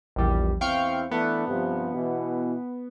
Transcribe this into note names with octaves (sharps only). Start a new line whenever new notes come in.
A#1 E2 G3
E2 C4 E4 F5 G5 C#6
E3 A3 B3 D4
G2 C3 F3
B2 E3